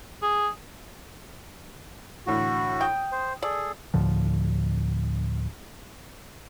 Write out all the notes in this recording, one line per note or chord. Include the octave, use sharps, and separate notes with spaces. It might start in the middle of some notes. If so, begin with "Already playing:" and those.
G#4
A2 D3 E3 F#4
G5 D#6
C5
G#4 A4 D5
D2 A2 D3 F3